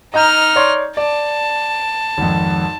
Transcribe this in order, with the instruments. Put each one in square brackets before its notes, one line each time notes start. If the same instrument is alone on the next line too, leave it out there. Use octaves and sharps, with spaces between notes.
[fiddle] D#4 F6 [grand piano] D#5 A#5 G6
[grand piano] C#5 D5 C6
[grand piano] D5 [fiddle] A5
[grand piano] G#1 F2